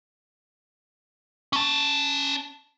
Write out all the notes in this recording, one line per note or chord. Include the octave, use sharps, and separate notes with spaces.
C#4 A5